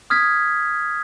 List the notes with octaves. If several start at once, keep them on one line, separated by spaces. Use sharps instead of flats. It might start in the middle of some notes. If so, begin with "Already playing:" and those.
D#6 F6 G#6 B6